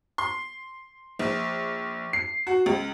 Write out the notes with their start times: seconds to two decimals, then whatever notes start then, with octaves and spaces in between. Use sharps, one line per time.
0.18 C6
1.19 A#1
2.13 C7
2.47 F#4
2.66 C#2